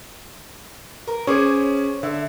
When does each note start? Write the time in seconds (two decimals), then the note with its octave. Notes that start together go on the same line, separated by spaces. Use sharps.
1.07 A#4
1.27 C#4 G#4 C5 C#5 D6
2.03 D3 E5